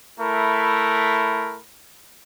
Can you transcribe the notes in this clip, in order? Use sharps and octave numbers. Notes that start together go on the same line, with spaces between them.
A3 E4 A#4 B5